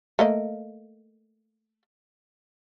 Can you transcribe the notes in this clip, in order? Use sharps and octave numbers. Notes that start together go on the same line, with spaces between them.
A3 A#3 D#5